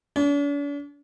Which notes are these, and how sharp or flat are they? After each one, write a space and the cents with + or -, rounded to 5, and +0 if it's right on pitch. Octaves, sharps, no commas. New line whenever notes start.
D4 -45